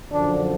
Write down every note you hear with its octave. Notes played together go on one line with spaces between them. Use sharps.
F#2 D3 F3 D4